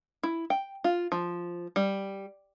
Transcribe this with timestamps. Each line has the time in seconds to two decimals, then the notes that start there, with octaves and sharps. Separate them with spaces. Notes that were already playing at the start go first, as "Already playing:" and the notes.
0.23 E4
0.50 G5
0.84 F4
1.12 F3
1.76 G3